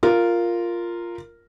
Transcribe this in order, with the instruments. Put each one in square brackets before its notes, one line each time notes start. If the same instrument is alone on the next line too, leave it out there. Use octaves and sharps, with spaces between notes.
[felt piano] F4 A#4